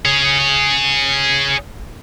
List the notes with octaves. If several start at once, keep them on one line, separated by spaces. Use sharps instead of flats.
G#4 C#5